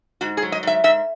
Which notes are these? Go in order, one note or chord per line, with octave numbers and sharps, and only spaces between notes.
G#2 F#4
G#4
F#3
D#5
G#2 E5
G#2 E5